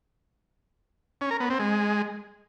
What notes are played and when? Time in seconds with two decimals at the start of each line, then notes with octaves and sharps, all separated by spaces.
1.21 C#4
1.31 A#4
1.40 B3
1.50 C4
1.59 G#3